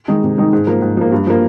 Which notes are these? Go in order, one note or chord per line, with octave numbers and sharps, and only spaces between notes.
D#3 G#3 D#4
C3
D#3 G#3 D#4
G#2
F3 A#3
G#2
F3 A#3
G2
F3 A#3